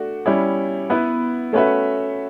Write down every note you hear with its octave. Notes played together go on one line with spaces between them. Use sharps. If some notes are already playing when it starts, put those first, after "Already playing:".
Already playing: A3 D4 F#4
G3 C#4 E4
B3 E4 B4
A3 C#4 F#4 B4 E5